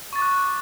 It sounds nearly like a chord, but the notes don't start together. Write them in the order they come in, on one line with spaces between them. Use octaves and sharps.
C#6 A6 D6 F#6